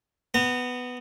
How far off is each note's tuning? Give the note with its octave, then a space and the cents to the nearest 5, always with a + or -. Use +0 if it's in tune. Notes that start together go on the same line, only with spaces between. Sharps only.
B3 +10 A#5 -35